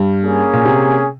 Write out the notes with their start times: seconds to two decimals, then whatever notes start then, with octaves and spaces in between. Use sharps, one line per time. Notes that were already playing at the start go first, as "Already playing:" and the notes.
Already playing: G2 G3
0.22 A#3 C#4 G#4
0.53 A#2
0.65 C3